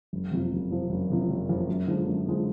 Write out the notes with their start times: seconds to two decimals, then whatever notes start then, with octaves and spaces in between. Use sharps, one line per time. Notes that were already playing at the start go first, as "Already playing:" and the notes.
0.13 F#1
0.31 F2 C3 F3
0.51 F#1
0.70 F2 C3 F3
0.90 F#1
1.10 F2 C3 F3
1.28 F#1
1.49 F2 C3 F3
1.68 F#2
1.87 D3 F3 G#3
2.07 F#2
2.26 D3 F3 G#3